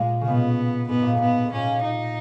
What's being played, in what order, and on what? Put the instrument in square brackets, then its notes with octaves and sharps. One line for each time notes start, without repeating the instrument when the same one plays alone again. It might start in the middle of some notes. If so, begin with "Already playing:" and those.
Already playing: [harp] A#2 [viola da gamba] G#3
[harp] C#3
[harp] B2 [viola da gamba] B3
[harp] G#2 [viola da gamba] B3
[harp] A#2
G#2
[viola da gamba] B3
[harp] G#2
[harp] A#2 [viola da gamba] C#4
[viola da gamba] D#4